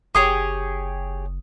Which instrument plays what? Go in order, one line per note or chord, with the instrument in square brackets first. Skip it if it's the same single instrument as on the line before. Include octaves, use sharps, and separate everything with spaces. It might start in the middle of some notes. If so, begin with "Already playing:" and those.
[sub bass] F#1 [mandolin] G4 G#4 C#5 [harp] D#6